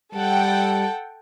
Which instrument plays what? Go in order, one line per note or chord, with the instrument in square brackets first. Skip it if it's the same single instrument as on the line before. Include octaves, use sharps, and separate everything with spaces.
[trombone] G3 [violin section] A4 F#5 G5